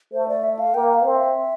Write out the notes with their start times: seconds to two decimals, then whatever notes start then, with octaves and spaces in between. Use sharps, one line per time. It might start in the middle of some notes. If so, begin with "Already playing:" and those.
0.13 A3 C5
0.28 D5
0.43 E5
0.59 F5
0.74 A#3 G5
0.94 F5
1.04 C4
1.15 E5